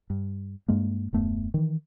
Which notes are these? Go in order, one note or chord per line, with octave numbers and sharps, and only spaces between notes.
G2
G2 G#3 A#3
D#1 F#2 A3 B3
D#3 E3